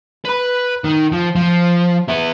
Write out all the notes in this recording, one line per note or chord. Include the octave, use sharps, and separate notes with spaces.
B4 B5
D#3
F3
F3
B3 E4